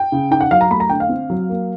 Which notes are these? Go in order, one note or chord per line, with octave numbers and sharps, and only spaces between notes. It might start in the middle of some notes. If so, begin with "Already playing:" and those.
Already playing: G5
C#3
D#4 G5
F#5
F#3 F5
A#5
A3 B5
A#5
D3 G5
F5
C4
F#3
A#3